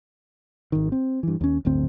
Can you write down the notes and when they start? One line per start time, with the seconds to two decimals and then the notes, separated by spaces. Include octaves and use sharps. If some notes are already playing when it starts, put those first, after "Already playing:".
0.72 G#1 D#3
0.92 C4
1.23 G2 E3
1.41 D#2 C#4
1.65 D1 G1 D2 C4